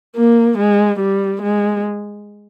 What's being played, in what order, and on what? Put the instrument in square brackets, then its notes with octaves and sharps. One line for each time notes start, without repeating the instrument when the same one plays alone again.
[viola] A#3
G#3
G3
G#3